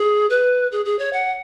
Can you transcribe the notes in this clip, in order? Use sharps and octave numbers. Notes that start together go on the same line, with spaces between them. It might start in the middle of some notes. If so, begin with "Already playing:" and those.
Already playing: G#4
B4
G#4
G#4
C#5
F#5